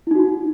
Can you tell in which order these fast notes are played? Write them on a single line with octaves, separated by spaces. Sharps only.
E4 D#4 F#4